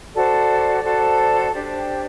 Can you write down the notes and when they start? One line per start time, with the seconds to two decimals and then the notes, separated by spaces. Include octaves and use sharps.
0.15 F#4 A4 C5 D5
0.84 F#4 A4 C5
1.52 D4 G4 C5 D5
1.75 G5